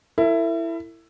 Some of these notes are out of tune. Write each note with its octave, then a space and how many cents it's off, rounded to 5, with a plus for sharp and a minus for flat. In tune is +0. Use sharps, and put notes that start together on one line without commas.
E4 +10 A4 +45